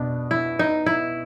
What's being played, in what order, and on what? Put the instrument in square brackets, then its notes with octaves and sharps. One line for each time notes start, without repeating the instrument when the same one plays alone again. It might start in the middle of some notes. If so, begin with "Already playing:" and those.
Already playing: [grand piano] B2 B3 [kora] D4
[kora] E4
D#4
E4